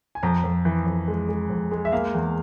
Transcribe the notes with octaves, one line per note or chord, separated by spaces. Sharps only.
G#5
F2 A#5
F2
E3
F2
G#3
G#3
F2
G#3
E5
A#3 F5
E2